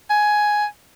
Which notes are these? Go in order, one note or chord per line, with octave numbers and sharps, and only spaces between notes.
G#5